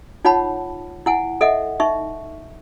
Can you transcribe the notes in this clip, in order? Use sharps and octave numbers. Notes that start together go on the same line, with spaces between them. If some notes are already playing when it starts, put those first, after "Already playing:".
D#4 F4 C#5 F#5 A5 B5
E4 F#5 G#5
A4 D#5 E5 F#5
D#4 E5 C#6